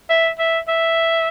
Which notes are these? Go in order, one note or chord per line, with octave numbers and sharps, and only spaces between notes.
E5
E5
E5